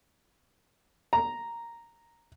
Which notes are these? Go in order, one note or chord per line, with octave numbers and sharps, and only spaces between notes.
A#5